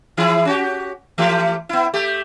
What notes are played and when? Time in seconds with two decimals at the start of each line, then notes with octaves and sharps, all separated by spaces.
0.17 E3 E4 G#4
0.45 C#4 F#4 G4
1.18 E3 A3 G4
1.69 B3 E4
1.94 A3 G4